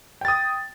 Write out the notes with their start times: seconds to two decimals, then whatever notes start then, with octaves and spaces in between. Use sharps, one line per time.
0.21 G5
0.25 A6
0.28 D#6